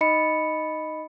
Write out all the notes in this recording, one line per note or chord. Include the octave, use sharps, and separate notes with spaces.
D#4 D#5 B5 C#7